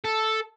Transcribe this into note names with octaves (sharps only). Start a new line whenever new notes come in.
A4